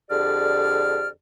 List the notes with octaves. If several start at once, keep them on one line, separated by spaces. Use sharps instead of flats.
F2 D3 G4 G#4 D5 F6